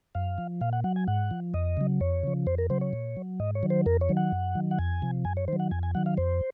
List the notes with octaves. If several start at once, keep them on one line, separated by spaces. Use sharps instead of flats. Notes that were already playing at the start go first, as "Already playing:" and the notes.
F#2 F5
F3
A#2 F5
F#5
F#3 F#5
G#5
G#2 F#5
F3
F2 D#5
C#3 F#3
F2 C#5
C#3 F3
F2 C5
A#4
C#3 F#3 C5
C#5
A#2
F#3
G#2 D#5
C#5
D#3 F#3
C5
F2 A#4
C#5
D#3 F#3
F#5
F#2
D#3 F#3
F#5
F2 G#5
C3 F3
F#2 G#5
C#5
D#3 F#3 C5
F#5
F2 G#5
G#5
D#3 F#3 F#5
F5
F2 C5